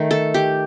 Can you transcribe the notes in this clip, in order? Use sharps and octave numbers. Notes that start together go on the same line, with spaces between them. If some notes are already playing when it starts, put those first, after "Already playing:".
Already playing: D#3 A3
A4
G4